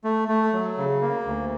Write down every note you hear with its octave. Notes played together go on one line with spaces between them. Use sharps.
A3
A3
F#3
C#3
A#3
D2